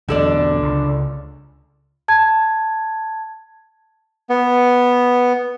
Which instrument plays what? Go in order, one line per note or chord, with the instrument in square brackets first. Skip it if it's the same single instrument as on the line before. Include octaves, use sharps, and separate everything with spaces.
[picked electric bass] B1 E2 B2 [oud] D3 A4 D5
[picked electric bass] C#2
[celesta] A5 G#6
[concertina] B3